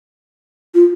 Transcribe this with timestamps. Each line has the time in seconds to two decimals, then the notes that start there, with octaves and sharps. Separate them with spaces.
0.74 F4